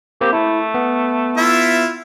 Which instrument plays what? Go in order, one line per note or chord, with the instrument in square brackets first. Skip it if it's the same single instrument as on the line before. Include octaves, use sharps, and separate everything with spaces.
[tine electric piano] A#3 C4 [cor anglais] G4
[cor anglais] A3 [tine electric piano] E4
[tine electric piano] B3
[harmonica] E4 F4 E5